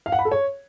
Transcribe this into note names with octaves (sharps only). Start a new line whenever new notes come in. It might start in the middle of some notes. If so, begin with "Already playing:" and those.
F5
F#5
B5
A4
C#5